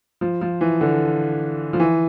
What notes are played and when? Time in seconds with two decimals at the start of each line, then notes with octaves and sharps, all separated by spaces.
0.21 F3
0.41 F3
0.61 E3
0.81 D3
1.73 F3
1.80 E3